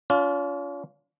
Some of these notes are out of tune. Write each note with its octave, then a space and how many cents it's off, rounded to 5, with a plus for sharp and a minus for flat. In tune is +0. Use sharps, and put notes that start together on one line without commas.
C#4 +45 F4 +5